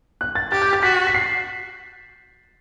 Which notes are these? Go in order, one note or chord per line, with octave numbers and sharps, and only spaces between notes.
F#6
A6
G4 A6
G6
A6
F#4 B6
B6
C7